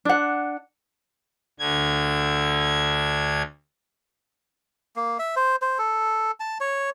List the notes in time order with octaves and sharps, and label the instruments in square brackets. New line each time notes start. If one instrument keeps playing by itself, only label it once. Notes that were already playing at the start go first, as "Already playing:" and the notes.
[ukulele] D4 F#5
[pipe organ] D2 D3 G#6
[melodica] A#3
E5
C5
C5
A4
A5
C#5